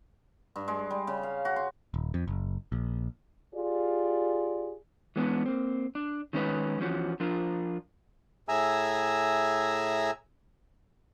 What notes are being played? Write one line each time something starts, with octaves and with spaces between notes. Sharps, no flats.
G2
G#3
G3
C#3
F5
F#4
C6
D#1
F2
F#1
A#1
F4 G4 G#4 D5
E3 G#3 B3 C#4 D4
A#3 C4
D4
D#3 G#3 C#4 D#4 B4
E3 F3 C#4 F#4
F3 D4 F4 A#4
A2 G#4 E5 G#5 A#5 E6